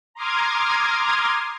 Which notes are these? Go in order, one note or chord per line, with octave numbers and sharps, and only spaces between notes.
A#5 C6 D6 D#6 F6 G#6